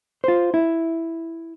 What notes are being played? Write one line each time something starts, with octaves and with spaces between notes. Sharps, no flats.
F4 C5
E4